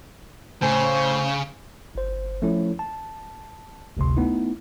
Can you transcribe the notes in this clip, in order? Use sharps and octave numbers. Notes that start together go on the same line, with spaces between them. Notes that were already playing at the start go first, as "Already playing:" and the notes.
A2 C#3 C5 G#5 G6
G1 C5
F3 A3 C#4 E4 A4 C#5
A5
G#1 D2 C3 C6
A3 B3 D#4 E4